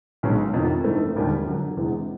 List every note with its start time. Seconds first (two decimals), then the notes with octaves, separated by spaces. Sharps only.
0.23 B1 B2 G#3 C#4
0.54 F2 C3 D#3
0.84 G2 E3 A3 C4 D#4
1.15 E1 D#2 D3 G3
1.46 F#2 D3 F#3
1.77 E1 E2 C3 E3 G#3